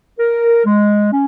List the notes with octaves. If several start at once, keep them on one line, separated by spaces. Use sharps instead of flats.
A#4
G#3
C#4